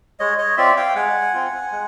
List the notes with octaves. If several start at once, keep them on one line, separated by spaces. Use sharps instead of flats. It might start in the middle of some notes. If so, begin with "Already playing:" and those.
G#3 C#5 D#5
C#5 D#5
C4 F4 D5 E5
F5 G5
G#3 F#5 G#5
C4 F4
G#3